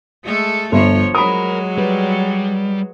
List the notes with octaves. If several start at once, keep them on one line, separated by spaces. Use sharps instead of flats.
G#3 A3 A4
G1 F3 C#5
F#3 G#3 A#4 B5 D#6
G3 B4